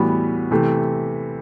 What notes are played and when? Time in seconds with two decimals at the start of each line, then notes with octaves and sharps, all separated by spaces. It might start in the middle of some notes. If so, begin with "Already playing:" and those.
Already playing: A2 E3 G3 B3 F#4
0.51 C3 E3 A3